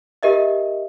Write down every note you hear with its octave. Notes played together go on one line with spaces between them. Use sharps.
G4 A#4 D#5 E5